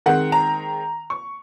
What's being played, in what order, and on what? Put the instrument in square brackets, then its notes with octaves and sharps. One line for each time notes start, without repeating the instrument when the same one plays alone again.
[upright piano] D#3 G#3 C4 F#5
A#5
C#6